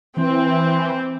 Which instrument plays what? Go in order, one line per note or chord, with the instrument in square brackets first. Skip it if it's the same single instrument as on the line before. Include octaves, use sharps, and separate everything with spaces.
[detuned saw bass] E3 [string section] C4